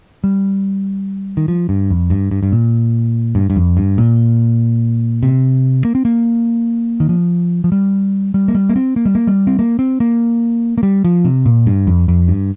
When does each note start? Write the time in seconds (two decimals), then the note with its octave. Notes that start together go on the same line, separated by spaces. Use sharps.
0.24 G3
1.37 D#3
1.48 F3
1.69 G2
1.91 F2
2.10 G2
2.31 G2
2.43 G2
2.52 A#2
3.35 G2
3.50 G2
3.56 F2
3.77 G2
3.98 A#2
5.23 C3
5.85 A#3
5.95 C4
6.05 A#3
7.00 D#3
7.09 F3
7.64 F3
7.72 G3
8.34 G3
8.48 A#3
8.55 G3
8.69 A#3
8.76 C4
8.96 A#3
9.05 G3
9.15 A#3
9.27 G3
9.47 C4
9.59 A#3
9.79 C4
10.00 A#3
10.78 A#3
10.83 G3
11.05 F3
11.25 C3
11.46 A#2
11.66 G2
11.87 F2
12.08 F2
12.28 G2